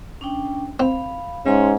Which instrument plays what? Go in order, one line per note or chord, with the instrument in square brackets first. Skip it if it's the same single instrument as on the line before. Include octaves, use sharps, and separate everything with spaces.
[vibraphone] C#4 D4 G5
[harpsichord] C4 [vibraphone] F5 B5
[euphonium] G#2 [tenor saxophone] C#4 [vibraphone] E5 G#5 C6